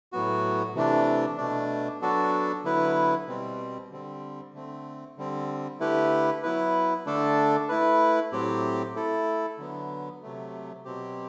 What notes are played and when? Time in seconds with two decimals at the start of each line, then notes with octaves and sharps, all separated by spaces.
0.12 A2 F#3 B3 F#4
0.75 C3 E3 A3 D4
1.38 B2 A3 D4
2.02 F#3 B3 D4 F#4 A4
2.64 D3 F#3 B3 E4 B4
3.27 B2 G3 C4
3.90 D3 G3 C4
4.53 D3 A3 C4
5.17 D3 G3 C4
5.80 D3 A3 E4 G4 B4
6.43 F#3 B3 E4 B4
7.06 D3 A3 D4 A4
7.69 A3 E4 B4
8.32 A2 F#3 C4 G4
8.95 A3 E4 A4
9.58 D3 F#3 B3
10.22 C3 F#3 A3
10.85 B2 F#3 C4 G4